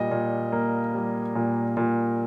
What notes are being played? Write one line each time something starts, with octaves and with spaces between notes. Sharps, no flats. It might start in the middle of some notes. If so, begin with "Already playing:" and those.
Already playing: A#2 G3 D#5
A#2
A#3
G3
A#2
A#2